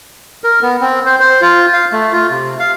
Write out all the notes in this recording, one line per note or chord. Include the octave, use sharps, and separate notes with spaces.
A#4
B3
C4
C5
C5
F4
F5
A3
F4
C3
F5